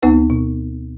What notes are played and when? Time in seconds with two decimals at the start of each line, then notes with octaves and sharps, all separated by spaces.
0.02 D2 B3 D#4 B4 F#5 G#5
0.30 B2